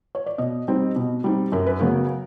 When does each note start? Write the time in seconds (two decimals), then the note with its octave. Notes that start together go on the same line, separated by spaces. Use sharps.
0.15 C#5
0.26 D5
0.38 B2 D#5
0.68 G3 C4 D#4
0.96 B2
1.24 G3 C4 D#4
1.52 F#2 A#4
1.67 B4
1.80 C#3 F#3 B3 A#4